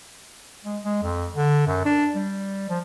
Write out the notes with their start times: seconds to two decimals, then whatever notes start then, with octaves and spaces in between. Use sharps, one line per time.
0.65 G#3
0.84 G#3
1.03 F2
1.36 D3
1.67 F#2
1.85 D4
2.15 G3
2.69 F3